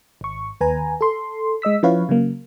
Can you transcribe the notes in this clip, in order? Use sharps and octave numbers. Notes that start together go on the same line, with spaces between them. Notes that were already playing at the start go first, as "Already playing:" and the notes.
G#1 C#6
D#2 B4 G#5 A#5
A4 C6
G#3 D#5 E6 B6
F3 C#4 E4 B4 C#5 F5
C#3 F#3 A#3